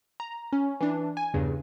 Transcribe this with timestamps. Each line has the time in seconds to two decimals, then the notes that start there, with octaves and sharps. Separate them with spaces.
0.20 A#5
0.53 C#4
0.81 E3 D4
1.17 G#5
1.34 E2 G2 C#3